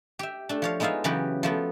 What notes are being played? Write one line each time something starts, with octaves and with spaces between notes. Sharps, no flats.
G4 E5
A3 D4
F3 C#5 F5
G#3 B3 D#4 F4 E5 F5
C#3 E3 F#3 B3 G4 B4
F3 A3 B3